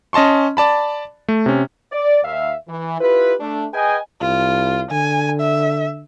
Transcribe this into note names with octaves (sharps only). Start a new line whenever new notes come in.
C#4 D#5 A5 C6 C#6
D5 A5 B5
A3
C3 C#4
D5
D#2 E5 F5
E3
E4 F4 G4 B4
A3 D4
G#4 B4 D#5 G5 G#5
C2 F4
D3 G#5
E5